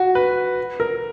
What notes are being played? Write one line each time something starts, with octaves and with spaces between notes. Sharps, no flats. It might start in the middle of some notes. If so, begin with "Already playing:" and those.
Already playing: F#4
B4
A#4